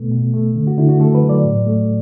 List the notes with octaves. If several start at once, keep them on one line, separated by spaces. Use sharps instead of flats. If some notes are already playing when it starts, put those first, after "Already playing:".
Already playing: B2 A3 B3
B2
A3
D3
F#4
D3 E4
F#4
A3 A4
B4
F#3
D5
A2
A3